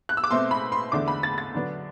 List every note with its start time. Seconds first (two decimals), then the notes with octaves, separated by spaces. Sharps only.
0.09 F#6
0.17 E6
0.24 D6
0.31 B2 A3 C4 C6
0.51 B5
0.72 C6
0.92 E2 D3 A3 D4 D6
1.08 B5
1.23 A6
1.38 A6
1.54 D3 F#3 B3 D4